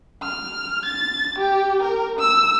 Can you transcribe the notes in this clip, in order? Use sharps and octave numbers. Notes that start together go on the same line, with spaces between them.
F6
A6
G4
A#4
E6